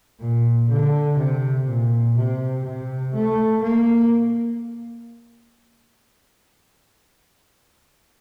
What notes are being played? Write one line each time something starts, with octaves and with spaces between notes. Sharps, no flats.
A#2
D3
C3
A#2
C3
C3
A3
A#3